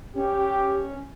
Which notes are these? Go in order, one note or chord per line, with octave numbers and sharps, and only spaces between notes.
C#4 G4